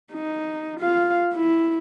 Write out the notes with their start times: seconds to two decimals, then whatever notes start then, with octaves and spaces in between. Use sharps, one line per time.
0.13 D#4
0.80 F4 F5
1.33 E4